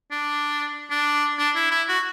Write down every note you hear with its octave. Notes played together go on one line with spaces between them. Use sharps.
D4
D4
D4
E4
E4
F#4